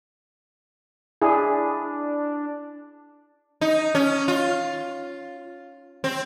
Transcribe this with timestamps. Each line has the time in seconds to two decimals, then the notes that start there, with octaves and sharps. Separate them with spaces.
1.22 D4 E4 G#4
3.61 D#4
3.95 C#4
4.28 F4
6.04 C4